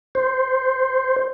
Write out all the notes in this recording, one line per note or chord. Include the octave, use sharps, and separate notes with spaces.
C5